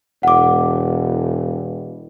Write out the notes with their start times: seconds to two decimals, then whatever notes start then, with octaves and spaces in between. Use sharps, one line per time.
0.23 E1 F#5 D6